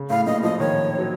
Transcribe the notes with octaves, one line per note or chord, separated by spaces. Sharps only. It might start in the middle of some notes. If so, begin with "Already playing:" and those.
Already playing: C#3
A2 F5
A#2 D#5
F3 D#5
D#3 C#5
F#3